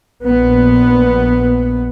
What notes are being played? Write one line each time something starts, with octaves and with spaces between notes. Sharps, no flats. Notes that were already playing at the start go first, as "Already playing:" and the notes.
A#1 B3